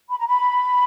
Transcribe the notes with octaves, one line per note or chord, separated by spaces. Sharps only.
B5
A#5
B5